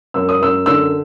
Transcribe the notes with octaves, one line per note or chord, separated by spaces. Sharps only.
F#2 E6
D#6
F#2 E6
D3 E6